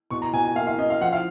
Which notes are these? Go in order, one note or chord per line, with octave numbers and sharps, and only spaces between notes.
B2 C#6
A#5
B2 G#5
G#5
A#3 F5
F5
C#4 D#5
F5
F3 F#5
F5